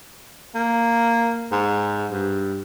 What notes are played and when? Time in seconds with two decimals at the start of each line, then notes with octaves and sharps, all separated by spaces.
0.55 A#3
1.52 G#2
2.12 G2